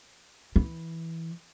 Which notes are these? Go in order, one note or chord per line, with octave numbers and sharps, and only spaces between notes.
E3